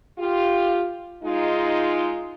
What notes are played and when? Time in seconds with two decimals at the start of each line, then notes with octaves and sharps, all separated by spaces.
0.19 F4 G4
1.23 G#3 D#4 F4